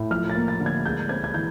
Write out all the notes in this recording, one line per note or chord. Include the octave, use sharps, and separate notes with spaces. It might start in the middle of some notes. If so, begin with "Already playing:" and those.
Already playing: A2
F3 F6
A6
A#3
A6
D3
G#6
G#3 G6
C4 G#6
G#6
E3 G6